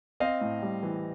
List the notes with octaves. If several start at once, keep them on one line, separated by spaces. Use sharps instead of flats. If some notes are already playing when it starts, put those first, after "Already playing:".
C4 D#5 F5
A2
G3
E3